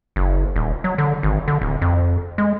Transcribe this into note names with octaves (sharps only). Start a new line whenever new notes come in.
F#1
D#1
F#3
D3
G#1
D3
D1
F2
G#3